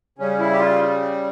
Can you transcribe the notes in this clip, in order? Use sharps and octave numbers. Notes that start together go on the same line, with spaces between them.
C#3 G3 C#4
E4
G4
F4